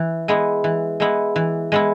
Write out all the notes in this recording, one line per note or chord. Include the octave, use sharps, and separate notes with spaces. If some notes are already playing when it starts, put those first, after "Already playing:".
Already playing: E3
G#3 B3 E4
E3
G#3 B3 E4
E3
G#3 B3 E4